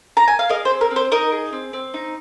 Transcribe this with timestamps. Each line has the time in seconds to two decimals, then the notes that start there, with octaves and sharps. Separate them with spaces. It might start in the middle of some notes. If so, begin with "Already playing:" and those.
0.17 A#5
0.28 G#5
0.39 F5
0.49 G#4 A#4 D#5
0.65 C5
0.71 C4
0.81 A#4
0.91 C4
0.96 C5
1.11 D#4 A#4 D#5
1.32 G#4
1.53 C4
1.73 C4
1.94 D#4